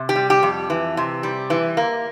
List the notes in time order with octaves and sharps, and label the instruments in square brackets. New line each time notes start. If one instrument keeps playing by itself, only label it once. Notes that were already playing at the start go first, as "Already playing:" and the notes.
Already playing: [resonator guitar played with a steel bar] C3
G4
G3
G4
F2
E3
C3
G3
E3
A#3